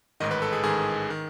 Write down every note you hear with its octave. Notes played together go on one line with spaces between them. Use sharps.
A1 G#2 D#3 D#5
B4
A4
G#4
A1 G#2 D#3 G#4
D#3